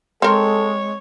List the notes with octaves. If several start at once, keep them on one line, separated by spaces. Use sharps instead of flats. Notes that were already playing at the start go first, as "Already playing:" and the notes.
G#3 C4 A4 A#4 C#5